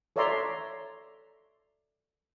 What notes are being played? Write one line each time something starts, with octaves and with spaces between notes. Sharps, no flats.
A4 C#5 D5 E5 A#5 C6